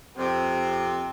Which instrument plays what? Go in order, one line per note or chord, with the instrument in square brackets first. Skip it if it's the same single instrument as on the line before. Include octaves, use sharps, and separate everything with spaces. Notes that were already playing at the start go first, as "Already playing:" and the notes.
[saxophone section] F2 C3 [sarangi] C4